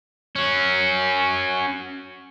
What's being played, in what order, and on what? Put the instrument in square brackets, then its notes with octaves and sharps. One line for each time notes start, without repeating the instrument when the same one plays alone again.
[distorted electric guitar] C#4 F#4